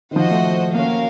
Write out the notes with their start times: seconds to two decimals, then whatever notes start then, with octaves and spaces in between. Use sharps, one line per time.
0.11 D#3
0.16 F3 F#4 C5 D#5 F#5
0.31 A3
0.74 A#3 C#4 F#4 A#4 F5